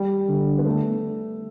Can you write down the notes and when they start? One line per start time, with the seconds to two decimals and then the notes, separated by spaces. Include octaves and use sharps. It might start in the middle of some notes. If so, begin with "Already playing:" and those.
Already playing: G3
0.29 D3
0.58 B3
0.66 A3